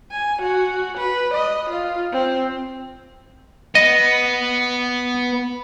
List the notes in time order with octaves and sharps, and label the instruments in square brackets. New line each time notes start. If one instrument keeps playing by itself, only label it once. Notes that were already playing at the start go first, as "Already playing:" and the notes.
[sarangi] G#5
F#4
B4
D#5
F4
C4
[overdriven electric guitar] B3 [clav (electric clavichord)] D#5